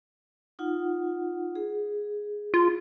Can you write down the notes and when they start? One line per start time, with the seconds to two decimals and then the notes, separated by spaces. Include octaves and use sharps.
0.59 D#4 F4 F#5
1.55 G#4
2.54 F4